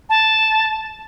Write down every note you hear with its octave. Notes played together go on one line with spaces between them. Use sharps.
A5